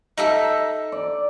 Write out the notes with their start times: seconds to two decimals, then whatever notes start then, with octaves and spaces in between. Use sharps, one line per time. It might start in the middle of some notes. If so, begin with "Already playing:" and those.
0.17 D#4 A4 E5
0.92 D5